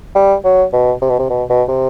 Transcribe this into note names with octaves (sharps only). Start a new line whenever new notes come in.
G3
F#3
B2
C3
B2
C3
B2
B2
C3